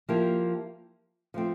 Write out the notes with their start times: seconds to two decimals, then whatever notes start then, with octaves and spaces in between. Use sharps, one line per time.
0.09 F3 A#3 E4 G4 A#4
1.34 F3 A3 C4